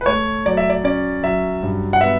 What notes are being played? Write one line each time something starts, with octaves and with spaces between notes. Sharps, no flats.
B4
A3 C#5
F#3 D5
E5
D5
C#4 D5
F#3 E5
G2
F#5
B3 E5